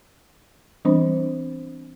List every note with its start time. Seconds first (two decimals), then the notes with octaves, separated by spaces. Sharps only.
0.85 E3 G3 B3 C4 D4 C5